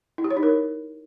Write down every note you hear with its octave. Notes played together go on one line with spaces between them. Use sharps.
E4
G4
C#5
D#4
A#4